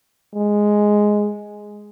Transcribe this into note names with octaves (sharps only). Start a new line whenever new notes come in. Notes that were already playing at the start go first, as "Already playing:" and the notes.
G#3